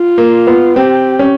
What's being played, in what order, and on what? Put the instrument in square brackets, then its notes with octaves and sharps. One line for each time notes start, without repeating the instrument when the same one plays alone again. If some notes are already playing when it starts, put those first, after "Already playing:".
Already playing: [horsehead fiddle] F4
[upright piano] A#3
B3
[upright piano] C4 [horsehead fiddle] G4
[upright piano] C#4